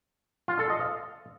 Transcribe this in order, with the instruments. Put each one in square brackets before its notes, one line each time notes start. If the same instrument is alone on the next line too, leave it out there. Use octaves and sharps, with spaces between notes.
[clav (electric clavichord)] F4
A4
D#5
F5